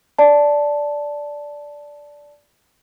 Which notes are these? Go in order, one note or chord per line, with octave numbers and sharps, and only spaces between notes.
D5 A5